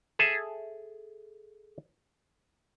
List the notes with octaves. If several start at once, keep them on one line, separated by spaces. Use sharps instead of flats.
G#4 A4 E5